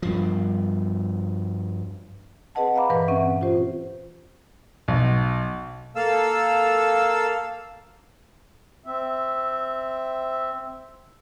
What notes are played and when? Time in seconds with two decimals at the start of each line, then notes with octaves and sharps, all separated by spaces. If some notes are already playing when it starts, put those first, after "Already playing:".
0.02 G2 F3
2.55 C4 G#4 B4 D#5 F#5 A5
2.76 F5 A#5 B5 D6
2.90 G2 A#2 E3 B4
3.08 C4 C#4 E5 F#5
3.41 F4 G4 C5
4.88 B1
5.96 A#3 A4 F5 E6
8.86 C4 E5